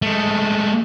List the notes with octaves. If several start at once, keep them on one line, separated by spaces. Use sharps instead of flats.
G#3 A3